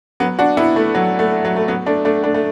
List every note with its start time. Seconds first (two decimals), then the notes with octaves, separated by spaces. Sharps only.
0.20 F#3 B3
0.39 D4 F#4
0.57 B3 E4
0.76 A3
0.95 F#3
1.19 A3
1.45 F#3
1.56 A3
1.68 F#3 B3
1.86 A3 D4
2.05 A3 D4
2.24 A3 D4
2.34 A3